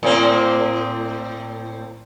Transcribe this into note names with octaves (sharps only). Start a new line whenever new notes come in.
A2 A#3 C4